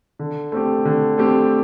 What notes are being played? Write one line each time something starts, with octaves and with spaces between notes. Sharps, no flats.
D3
A3 C4 G4
D3
A3 C4 G4